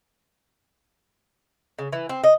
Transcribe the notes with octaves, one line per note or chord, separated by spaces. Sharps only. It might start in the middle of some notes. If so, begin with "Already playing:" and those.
C#3
E3
C4
D#5